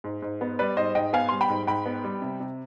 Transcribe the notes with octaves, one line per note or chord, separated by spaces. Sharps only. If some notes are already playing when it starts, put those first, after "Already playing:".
G#2
G#2
B3
G3 B4 D5
G#2 C5 D#5
G#2 D#5 G5
B3 F5 G#5
G3 C6
G5 B5
G#2
G#2 G5 B5
B3
G3
C3
C3